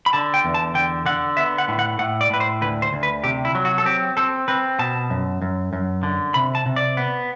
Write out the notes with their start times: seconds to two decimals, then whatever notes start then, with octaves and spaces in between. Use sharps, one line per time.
0.06 B5
0.13 D3 A5
0.34 G5
0.44 E2
0.54 A5
0.74 D3 G5
1.06 D3 F#5
1.37 B3 E5
1.58 F#5
1.68 A2
1.79 F#5
1.99 A2 F#5
2.21 D5
2.30 A2 B4
2.40 C5
2.62 D2 B4
2.82 C5
2.93 D2
3.03 B4
3.24 C3 G4
3.45 E4
3.55 F#3
3.65 F#4
3.78 A4
3.86 C4 G4
4.17 C4 A4
4.48 C4 B4
4.79 B2 A5
5.10 F#2
5.42 F#2
5.73 F#2
6.03 D3
6.34 C3 B5
6.55 A5
6.66 C3
6.76 D5
6.97 B3